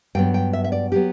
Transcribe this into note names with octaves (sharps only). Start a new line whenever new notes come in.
G2 F#3 B3 G5
G5
E5
E5
D5
F#3 B3 G4